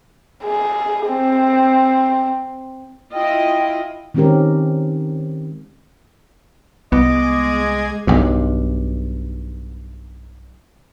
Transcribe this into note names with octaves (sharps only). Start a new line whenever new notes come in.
G#4
C4
E4 F4 D#5 G5
D#3 G#3 C4 C#4 G4 A#4
C2 G#3 B3 G#4 D#5 D6 G#6
B1 G2